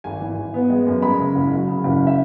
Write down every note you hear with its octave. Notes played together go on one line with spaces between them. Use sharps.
G#1 G#5
E3
G#1
B3
G#3
F#2
G#3 B5
C#3
F#1
F#3
C#3
F#1
E5